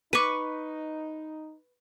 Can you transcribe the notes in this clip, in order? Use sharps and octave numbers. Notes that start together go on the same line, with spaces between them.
D#4 B4 C#6 D6 D#7